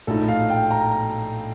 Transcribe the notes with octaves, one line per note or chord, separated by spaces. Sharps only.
A#1 A2 A3 D#4 A4
F5
G5
A#5